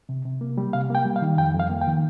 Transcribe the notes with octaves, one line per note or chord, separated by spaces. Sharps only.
C3
C3
A#3
G3
C3 F5
A#3 G5
G3
F5
D#3
F2 G5
F2
F5
A#3
G5
D#3